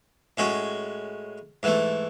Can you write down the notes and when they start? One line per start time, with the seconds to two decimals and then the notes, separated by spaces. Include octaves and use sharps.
0.37 A2 G#3 C#4 F#4
1.63 G#2 E3 A3